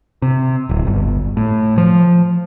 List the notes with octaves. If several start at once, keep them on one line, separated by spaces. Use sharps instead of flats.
C3
D1
G1
A2
F3